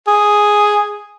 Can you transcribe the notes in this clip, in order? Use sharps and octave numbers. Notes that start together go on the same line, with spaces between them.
G#4